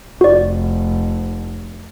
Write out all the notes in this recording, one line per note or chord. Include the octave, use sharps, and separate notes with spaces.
F1 F#4 D5